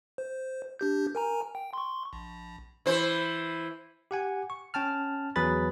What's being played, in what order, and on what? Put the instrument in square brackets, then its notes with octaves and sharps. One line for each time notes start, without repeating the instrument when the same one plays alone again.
[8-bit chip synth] C5
D4 G4 G6
A#4 G#5 A#5
G5
C6 C#6
A#1
[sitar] E3 C5
[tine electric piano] G4 F#5 G#5
C#6
C#4 G5 A5 F6
E2 F#3 G#4 B4 B5 A6